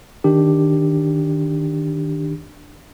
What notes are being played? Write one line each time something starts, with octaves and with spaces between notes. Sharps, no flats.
D#3 D4 G4